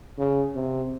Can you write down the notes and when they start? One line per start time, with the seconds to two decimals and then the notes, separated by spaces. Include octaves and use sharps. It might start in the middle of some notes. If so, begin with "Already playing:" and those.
0.18 C#3
0.55 C3